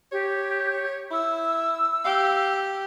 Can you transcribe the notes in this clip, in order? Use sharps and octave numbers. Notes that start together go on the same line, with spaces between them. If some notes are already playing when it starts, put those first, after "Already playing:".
G4 C#5
E4 E6
G4 F5